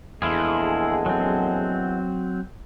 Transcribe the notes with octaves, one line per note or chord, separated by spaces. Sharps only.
A#1 E2 G#3 E4 F4 G#4 A4
F#3 C4